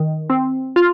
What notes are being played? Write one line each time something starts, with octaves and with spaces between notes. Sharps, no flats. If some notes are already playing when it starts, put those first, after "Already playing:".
Already playing: D#3
C4
F4